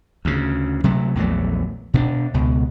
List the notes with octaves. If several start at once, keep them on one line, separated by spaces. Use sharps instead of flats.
D2 C#3
C3 F#3 A3
A#1 E2 F#3 A3
B2 C4 D4
C#2 B2